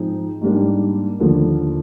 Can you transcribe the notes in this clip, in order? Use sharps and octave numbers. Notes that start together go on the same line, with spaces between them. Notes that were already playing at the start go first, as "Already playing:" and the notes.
Already playing: G#2 F3 G#3 C4 D#4
G#2 G3 A#3 D4
D#2 D3 F3 A#3